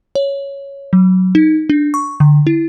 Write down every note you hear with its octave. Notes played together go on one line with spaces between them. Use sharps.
C#5
F#3
D#4
D4
C#6
D3
E4